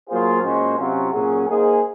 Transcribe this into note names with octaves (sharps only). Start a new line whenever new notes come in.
F#3 A#3 F4 G#4 C5
A#2 G#3 C#4 F#4 C5
C3 F#3 C#4 F4
A#2 F#3 C#4 G#4
A#3 D#4 G#4 C5